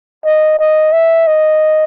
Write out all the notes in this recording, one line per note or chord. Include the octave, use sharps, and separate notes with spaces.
D#5
D#5
E5
D#5